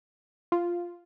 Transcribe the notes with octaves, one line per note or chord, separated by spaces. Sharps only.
F4